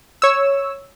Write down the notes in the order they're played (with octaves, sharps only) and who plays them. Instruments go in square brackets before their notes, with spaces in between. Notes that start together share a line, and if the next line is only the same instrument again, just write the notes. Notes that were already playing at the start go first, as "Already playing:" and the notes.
[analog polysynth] C#5 E6